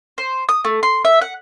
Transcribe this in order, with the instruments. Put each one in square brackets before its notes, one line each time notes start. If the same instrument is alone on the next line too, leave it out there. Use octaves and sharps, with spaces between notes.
[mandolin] C5
D#6
A3
C6
E5
F#5